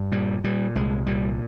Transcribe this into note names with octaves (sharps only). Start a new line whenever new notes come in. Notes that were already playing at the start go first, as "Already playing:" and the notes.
Already playing: G2
A#2 G3
A#2 G3
C2 G#3
A#2 G3